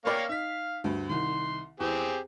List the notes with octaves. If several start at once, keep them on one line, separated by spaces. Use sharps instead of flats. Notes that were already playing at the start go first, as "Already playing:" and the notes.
A#3 A#4 C#5 D5 F5 G5
D#4 F5 B6
D2 G2
C2 D#3 C6
E2 C4 G4 G#4